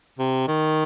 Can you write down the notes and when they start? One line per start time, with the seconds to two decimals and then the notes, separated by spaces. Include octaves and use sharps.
0.19 C3
0.48 D#3